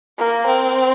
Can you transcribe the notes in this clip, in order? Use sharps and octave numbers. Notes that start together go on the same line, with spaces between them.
A#3
C4